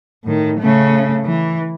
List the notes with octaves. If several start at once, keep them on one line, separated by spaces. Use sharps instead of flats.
A2 D#3
C#3 A3
E3